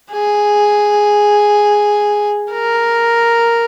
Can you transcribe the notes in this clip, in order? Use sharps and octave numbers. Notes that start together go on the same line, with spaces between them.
G#4
A#4